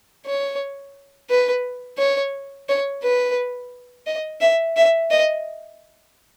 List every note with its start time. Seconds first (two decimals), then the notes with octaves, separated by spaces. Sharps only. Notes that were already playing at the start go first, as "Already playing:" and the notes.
0.26 C#5
1.30 B4
1.99 C#5
2.69 C#5
3.03 B4
4.07 D#5
4.41 E5
4.76 E5
5.11 D#5